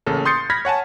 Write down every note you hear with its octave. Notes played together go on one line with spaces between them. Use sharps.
A1 C#3 A#3 A4
C6 D#6 G6 A6 C7 C#7
B5 F6 G#6 A#6 B6
C#5 F#5 G#5 A5